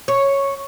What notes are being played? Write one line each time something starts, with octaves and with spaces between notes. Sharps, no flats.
C#5